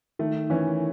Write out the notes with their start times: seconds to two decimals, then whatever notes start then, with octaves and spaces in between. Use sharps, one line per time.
0.19 D#3 A3
0.50 E3 C#4